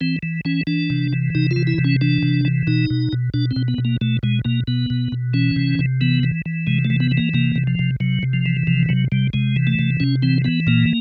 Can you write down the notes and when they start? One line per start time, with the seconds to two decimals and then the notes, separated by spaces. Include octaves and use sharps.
0.01 E3 C4
0.23 E3
0.45 E3 C#4
0.67 E3 D4
0.90 C3
1.13 E3
1.35 C3 D#4
1.51 F4
1.56 E3
1.67 E4
1.78 C3
1.84 C#4
2.01 E3 D4
2.23 C3
2.45 E3
2.67 B2 D#4
2.90 B2
3.13 B2
3.34 B2 D4
3.51 C4
3.56 B2
3.68 B3
3.78 B2
3.85 A#3
4.01 B2 A3
4.23 B2 G#3
4.45 B2 A#3
4.68 B2 B3
4.90 B2
5.12 B2
5.34 E3 C#4
5.56 C3
5.79 C3
6.01 E3 B3
6.23 E3
6.46 E3
6.67 C3 G#3
6.85 A3
6.90 E3
7.00 B3
7.11 E3
7.17 A#3
7.34 C3 A#3
7.56 C3
7.67 F3
7.79 C3
8.00 C3 F#3
8.23 C3
8.33 F3
8.46 E3
8.67 C3 F3
8.89 C3 F#3
9.12 C3 G3
9.33 C3 G#3
9.56 E3
9.67 A3
9.79 C3
10.00 C3 C#4
10.22 E3 C4
10.44 E3 B3
10.67 A#2 A#3